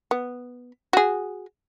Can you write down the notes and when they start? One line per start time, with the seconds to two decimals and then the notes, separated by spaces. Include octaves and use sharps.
0.11 B3
0.93 F#4 G#4